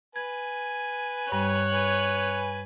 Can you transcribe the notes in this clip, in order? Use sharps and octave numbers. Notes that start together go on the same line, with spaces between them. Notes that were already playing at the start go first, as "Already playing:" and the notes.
B4 G#5 G#6
G2 G3 C#5 F#6
B4 G#5